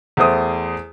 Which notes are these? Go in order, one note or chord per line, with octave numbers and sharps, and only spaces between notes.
E2 A3 C5 D#6